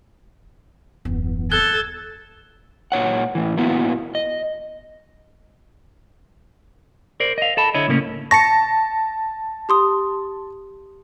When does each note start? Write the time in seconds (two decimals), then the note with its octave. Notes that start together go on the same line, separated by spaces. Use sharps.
1.05 D#1 F#2 E3 B3
1.52 A4 F#6 G#6 G7
2.92 A#2 C#5 F#5
3.35 A2 E3
3.57 A#2 A#3 B3 E4 F#4
4.15 D#5
7.20 A#4 C5 D5
7.38 D#5 F5
7.57 A4 A5 B5
7.74 D3 E4 C#5 D#5
7.88 A2 C#3 A#3 C#4
8.31 A5 C#6 A#6 C#7
9.69 G4 C6 D#6